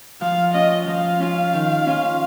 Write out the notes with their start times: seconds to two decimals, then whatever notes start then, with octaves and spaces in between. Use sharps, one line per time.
0.21 F3 F5
0.54 C#4 F4 D#5
0.87 F3 F5
1.20 C#4 F4
1.53 D#3
1.87 C#4 F4